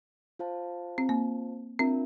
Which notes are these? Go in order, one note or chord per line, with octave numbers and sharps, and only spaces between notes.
F4 C5 F5 A5
C4
A#3
C4 D4 F4 A#4 E5